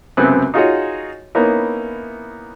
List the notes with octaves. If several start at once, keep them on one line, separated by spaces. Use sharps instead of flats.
C#2 F#2 C3 B3 C4 F#6
D#4 F4 F#4 G#4 C#5 D#5
A#3 B3 C#4 D#4 E4 A#4